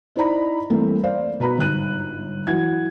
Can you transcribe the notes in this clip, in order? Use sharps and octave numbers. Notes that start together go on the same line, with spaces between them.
D#4 E4 C5 D5 A#5 B5
E3 G3 A3 A#3 C4
C5 D5 F5
B2 B4 A#5 B5
G1 G#2 F#6 D#7
E3 F#3 F#5 G#6